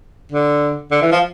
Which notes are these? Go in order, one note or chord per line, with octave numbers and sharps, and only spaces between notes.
D3
D3
E3
F3